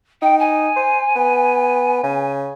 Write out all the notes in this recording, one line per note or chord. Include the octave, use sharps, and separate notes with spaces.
D#4 G5
G#5
C5
B3
C#3